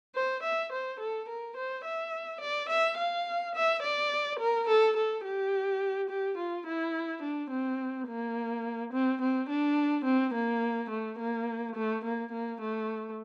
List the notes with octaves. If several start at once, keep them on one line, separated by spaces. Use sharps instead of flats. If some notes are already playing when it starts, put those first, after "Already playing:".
C5
E5
C5
A4
A#4
C5
E5
D5
E5
F5
E5
D5
A#4
A4
A4
G4
G4
F4
E4
D4
C4
A#3
C4
C4
D4
C4
A#3
A3
A#3
A3
A#3
A#3
A3